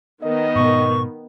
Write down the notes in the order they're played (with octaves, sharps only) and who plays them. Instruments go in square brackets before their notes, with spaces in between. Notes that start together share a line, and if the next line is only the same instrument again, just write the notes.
[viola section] D#3 B3 [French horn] D#5
[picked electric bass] G#2 B2 [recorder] C#6